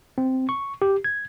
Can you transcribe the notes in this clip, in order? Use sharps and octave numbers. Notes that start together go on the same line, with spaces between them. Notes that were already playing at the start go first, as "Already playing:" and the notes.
C4
C#6
G4
G#6